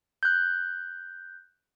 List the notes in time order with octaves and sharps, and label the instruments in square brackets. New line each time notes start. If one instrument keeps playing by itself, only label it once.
[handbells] F#6 G6